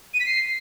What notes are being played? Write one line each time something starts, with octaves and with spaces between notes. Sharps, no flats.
D#7
B6
C7